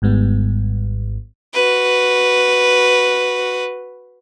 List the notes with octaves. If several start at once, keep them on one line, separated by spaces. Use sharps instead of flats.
G#1 G#2 G3 B3
F#4 B4